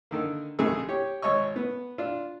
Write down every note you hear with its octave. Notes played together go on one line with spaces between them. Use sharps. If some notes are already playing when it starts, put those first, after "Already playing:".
D3 D#3 A#3
A#1 C3 D#3 A3 G#4
G4 C#5
G#1 C#5 D#5 C#6
B3
D4 F4